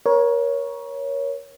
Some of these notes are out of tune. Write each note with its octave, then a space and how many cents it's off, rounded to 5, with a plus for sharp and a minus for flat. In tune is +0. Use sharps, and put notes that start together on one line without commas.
A#4 +30 C#5 +0